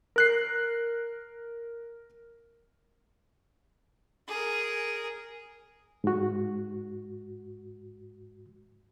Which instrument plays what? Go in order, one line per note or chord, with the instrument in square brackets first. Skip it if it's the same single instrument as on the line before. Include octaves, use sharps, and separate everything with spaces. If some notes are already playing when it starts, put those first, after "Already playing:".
[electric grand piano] A#4 F#6 C7
[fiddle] G#4 A#4
[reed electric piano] G#2 F#4